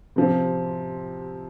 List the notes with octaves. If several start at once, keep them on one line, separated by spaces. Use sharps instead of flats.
C3 F3 C4